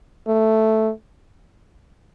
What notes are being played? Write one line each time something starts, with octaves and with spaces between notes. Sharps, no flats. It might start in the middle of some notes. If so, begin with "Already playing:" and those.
A3